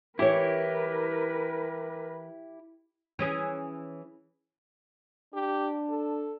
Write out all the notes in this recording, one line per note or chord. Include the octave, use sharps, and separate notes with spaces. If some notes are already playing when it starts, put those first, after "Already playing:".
E3 E4 G4 A#4 B4 C#5
E3 C#4 G#4
D4 G4
A4